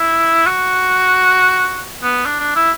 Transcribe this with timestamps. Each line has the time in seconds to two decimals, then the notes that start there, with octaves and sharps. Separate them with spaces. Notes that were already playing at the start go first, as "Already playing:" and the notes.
Already playing: E4
0.47 F#4
2.03 B3
2.25 D4
2.40 D4
2.56 E4